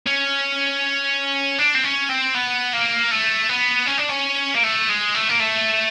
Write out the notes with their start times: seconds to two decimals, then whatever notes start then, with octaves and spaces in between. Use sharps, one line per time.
0.06 C#4
1.59 D4
1.75 C4
1.84 C#4
2.09 C4
2.35 B3
2.73 A#3
3.11 A3
3.49 B3
3.87 C#4
3.99 D4
4.10 C#4
4.55 A#3
4.63 A3
4.89 G#3
5.15 A3
5.29 A#3
5.40 A3